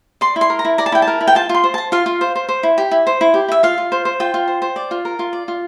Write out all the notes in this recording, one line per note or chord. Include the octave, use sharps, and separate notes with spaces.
D5 C6
E4
C6
A#4
A#5
E4
D5 A#5
A5
E4 G5
A5
A#4
E4
G5
F4 A5
F4 C6
C5
C5 A5
F4 F5
F4
C5
C5
C5
E4
G4
E4
C5
E4
G4
E4 E5
F4 F5
F4
C5
C5
F4 G5
F4
C5
C5
D5
F4
A#4
F4
D5
F4